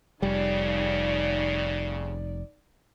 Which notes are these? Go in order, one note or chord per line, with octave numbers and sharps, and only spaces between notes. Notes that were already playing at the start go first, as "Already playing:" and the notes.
F1 F2 C#3 G3 D#4 D5